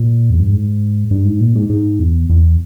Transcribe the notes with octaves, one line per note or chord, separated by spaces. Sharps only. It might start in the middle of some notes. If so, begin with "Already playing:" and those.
Already playing: A#2
E2
G2
G#2
G2
G#2
A#2
G#2
G#2
E2
E2